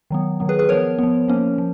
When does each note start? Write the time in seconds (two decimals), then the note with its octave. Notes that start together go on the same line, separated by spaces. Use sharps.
0.11 D#3 F#3 B3
0.40 D#3 F#3 B3
0.49 G#4 B4
0.59 G#4 B4
0.69 F3 B3 A#4 C#5
0.99 F3 B3
1.28 F3 A#3 C#4
1.58 F3